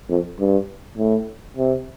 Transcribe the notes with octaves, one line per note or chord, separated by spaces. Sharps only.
F2
G2
A2
C3